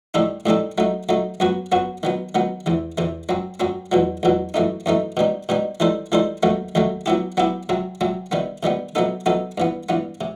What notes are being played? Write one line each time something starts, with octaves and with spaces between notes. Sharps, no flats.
A2 G3 C4 D#4 A4
A2 G3 C4 D#4 A4
F#3 A3 D#4
F#3 A3 D#4
F#2 F#3 B3 F#4
F#2 F#3 B3 F#4
D#3 F#3 B3
D#3 F#3 B3
E2 C3 E3
E2 C3 E3
F#2 F#3 C4
F#2 F#3 C4
E2 B2 F#3
E2 B2 F#3
F#2 E3 A3 D#4
F#2 E3 A3 D#4
B2 G3 D#4
B2 G3 D#4
E3 G3 D#4 A4 C5
E3 G3 D#4 A4 C5
D#2 D#3 F#3 A3
D#2 D#3 F#3 A3
F#3 B3 E4 G4
F#3 B3 E4 G4
C3 F#3 C4
C3 F#3 C4
C3 D#3 G3 B3
C3 D#3 G3 B3
C3 F#3 B3 D#4 A4
C3 F#3 B3 D#4 A4
G2 E3 B3
G2 E3 B3
C3